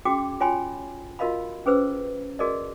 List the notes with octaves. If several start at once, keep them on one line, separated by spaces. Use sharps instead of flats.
C#4 F#4 G#4 G5 D6
F4 C#5 G5 G#5 B5 C6
F4 F#4 A#4 D#5 F5 B5
C#4 G#4 B4 C5 E6
F#4 G#4 A#4 D5 D#5